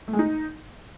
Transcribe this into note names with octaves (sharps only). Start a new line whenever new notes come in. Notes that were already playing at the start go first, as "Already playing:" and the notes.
A3
G#3
D#4